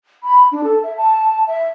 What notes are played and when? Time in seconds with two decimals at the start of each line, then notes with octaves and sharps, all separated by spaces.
0.23 B5
0.52 D4
0.64 A4
0.83 E5
0.97 A5
1.47 E5